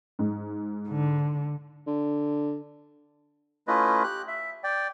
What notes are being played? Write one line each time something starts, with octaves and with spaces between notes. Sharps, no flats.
G#2
D3
D3
A3 C#4 E4 F4 B4 D#5
G4 F#6
E5
D5 G5